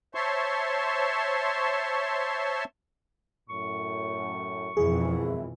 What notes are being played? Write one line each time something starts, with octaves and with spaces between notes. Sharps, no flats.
C5 C#5 E5 A5 C6 C#6
F#2 A2 C#6
G#1 F2 B2 E3 E4 G#4